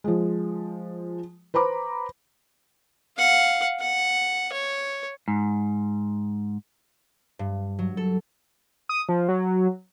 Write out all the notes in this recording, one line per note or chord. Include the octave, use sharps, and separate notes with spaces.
F3 G#3
B4 C5 A#5 B5 D6
F5 F#5
F#5
C#5
G#2
G2
F#3
A4
D#6
F3
F#3